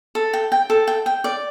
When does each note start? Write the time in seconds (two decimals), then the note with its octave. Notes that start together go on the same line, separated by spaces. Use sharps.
0.15 A4
0.33 G5
0.52 G5
0.70 A4
0.87 G5
1.06 G5
1.24 D5